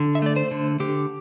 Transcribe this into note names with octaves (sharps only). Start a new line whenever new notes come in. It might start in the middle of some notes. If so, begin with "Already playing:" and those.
Already playing: D3
E5
A3 D5
C5
D3
D3 G4